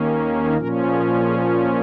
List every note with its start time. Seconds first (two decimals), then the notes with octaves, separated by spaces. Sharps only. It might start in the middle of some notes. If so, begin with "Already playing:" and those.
Already playing: D#2 D#3 A#3 C#4
0.57 A#2 F3 C#4 A#4
0.91 G#4
1.25 G#4